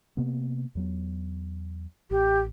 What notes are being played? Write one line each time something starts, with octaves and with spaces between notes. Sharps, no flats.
C3 A#3 B3
E2 F#3 B3
A1 G4